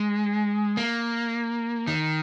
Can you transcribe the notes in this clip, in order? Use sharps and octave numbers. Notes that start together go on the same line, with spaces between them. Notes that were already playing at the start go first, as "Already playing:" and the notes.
Already playing: G#3
A#3
D#3